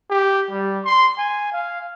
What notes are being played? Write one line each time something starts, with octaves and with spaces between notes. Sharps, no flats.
G4
G3
C6
G#5
F5